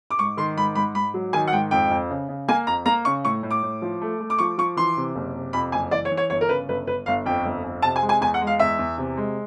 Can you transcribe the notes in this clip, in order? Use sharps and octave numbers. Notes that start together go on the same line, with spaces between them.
D6
G#2 C#6
D#3 C6
G#2 B5
G#2 B5
G#2 B5
F#3
D#3 G#5
F#5
G#2 G5
F2 G5
F2
C#3
C#3
A#3 G#5
F2 A#5
A#3 A#5
C#3 C#6
A2 C#6
A2
D6
A2
F3
A3
A3
D6
F3 C#6
F3 C#6
E3 C6
C3
F#1
C3
F2 B5
F#1 G#5
E3 D5
C#5
E3
C#5
G1 C#5
A#4
C#3 B4
G1 B4
G1 B4
G1 F5
F2 G5
G1
F2
C3 A5
G#5
G#3
G#5
E2 G#5
F#5
G#3
F5
E2 E5
E2
C3
G#3